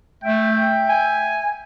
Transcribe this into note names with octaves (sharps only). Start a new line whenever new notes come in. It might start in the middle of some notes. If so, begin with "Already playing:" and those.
A3 E5 G5
G#5